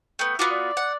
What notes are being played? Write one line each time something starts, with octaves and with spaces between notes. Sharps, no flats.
A3 B3 G5
B3 F4 F#4 D6
D5
F#5